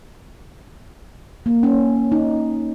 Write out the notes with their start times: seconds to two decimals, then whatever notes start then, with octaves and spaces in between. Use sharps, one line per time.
1.46 A#3
1.63 C#4
2.12 D#4